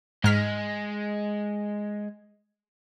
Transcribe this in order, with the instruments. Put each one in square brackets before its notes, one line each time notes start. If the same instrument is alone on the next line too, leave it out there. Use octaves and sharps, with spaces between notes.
[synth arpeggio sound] G#2 F6 B6 [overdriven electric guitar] G#3